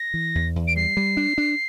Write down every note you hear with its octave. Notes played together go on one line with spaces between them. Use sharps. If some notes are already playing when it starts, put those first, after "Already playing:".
Already playing: A#6
E3
E2
E2
D7
G3 C7
G3
D4
D4